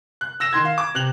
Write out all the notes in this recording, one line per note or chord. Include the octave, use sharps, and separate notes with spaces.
F#6
E6 A#6 E7
D#3 C6 G#6 A#6
F5
D6
C3 F#6 F7 F#7